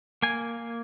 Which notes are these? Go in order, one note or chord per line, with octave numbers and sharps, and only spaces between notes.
A#3 G#5